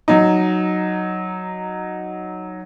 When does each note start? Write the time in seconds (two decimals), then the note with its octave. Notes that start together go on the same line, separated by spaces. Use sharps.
0.08 F#3 D#4